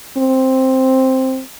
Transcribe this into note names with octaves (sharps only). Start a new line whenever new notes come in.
C4